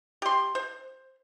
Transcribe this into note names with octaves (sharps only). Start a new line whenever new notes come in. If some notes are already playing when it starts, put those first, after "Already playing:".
G4 C6
C5